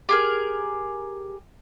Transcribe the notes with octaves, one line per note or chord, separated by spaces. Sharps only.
G4 G#4 A#4